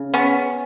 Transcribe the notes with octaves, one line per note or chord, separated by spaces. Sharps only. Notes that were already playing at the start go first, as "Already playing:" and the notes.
Already playing: C#3
B3 C#4